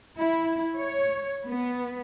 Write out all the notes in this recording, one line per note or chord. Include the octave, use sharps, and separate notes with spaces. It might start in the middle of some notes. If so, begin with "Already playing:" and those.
E4
C#5
B3